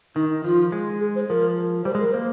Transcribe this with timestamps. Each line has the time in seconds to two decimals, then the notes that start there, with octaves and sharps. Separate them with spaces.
0.16 D#3 D#4
0.44 F3 F4
0.72 G#3
1.00 G#4
1.16 C5
1.29 F3 A#4
1.85 G3 C5
1.95 G#3
1.99 A#4
2.12 A#3 C5